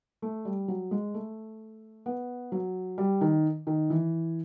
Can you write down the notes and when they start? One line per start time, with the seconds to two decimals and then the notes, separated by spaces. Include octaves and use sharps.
0.22 A3
0.45 G3
0.68 F#3
0.91 G#3
1.14 A3
2.06 B3
2.52 F#3
2.98 G3
3.21 D#3
3.67 D#3
3.90 E3